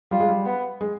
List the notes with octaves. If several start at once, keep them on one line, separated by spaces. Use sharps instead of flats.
G3 F4
G#3
G3
B3
G#3